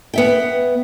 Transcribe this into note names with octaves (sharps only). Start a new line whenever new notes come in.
B3 E5 G5